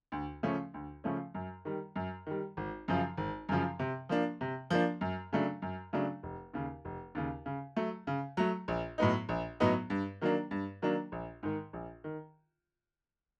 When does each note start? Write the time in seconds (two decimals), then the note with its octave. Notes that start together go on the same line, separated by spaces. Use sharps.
0.12 D2
0.43 C#3 F3 A3 C#4
0.74 D2
1.04 C#3 F3 A3 C#4
1.34 F#2
1.65 D#3 G3
1.96 F#2
2.26 D#3 G3
2.57 G#1
2.88 F#2 C#3 F3
3.17 G#1
3.49 F#2 C#3 F3
3.79 C3
4.09 F3 A#3 D4
4.41 C3
4.70 F3 A#3 D4
5.01 F#2
5.33 C#3 F#3 A3 D4
5.62 F#2
5.93 C#3 F#3 A3 D4
6.23 F1
6.54 D#2 C#3
6.85 F1
7.15 D#2 C#3
7.46 C#3
7.76 F#3 A3
8.07 C#3
8.37 F#3 A3
8.68 A#1
8.98 A2 F#3 B3 D#4
9.29 A#1
9.60 A2 F#3 B3 D#4
9.90 G2
10.21 D#3 F#3 A#3 D4
10.51 G2
10.82 D#3 F#3 A#3 D4
11.12 A#1
11.43 G#2 D#3
11.73 A#1
12.04 D#3